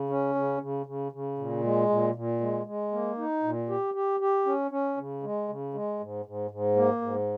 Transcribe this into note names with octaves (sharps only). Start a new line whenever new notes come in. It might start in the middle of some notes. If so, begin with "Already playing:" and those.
Already playing: C#3
C#4
C#3
C#3
C#3
C#3
A#2
G#3
A#2
A#2
G#3
G#3
A#3
D#4
A#2
G4
G4
G4
C#4
C#4
C#3
G#3
C#3
G#3
G#2
G#2
G#2
A#3
G#2